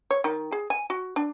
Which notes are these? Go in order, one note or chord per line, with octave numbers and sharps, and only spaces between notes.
C#5
D#3
G#4
G#5
F#4
D4